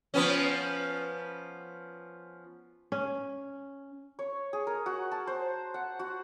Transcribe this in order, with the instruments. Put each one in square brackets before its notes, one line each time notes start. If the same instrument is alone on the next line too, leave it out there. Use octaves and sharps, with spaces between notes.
[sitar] F3 B3 C#4
[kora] C#4
[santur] C#5
G#4
A#4
F#4
A5
C5
F#5
F#4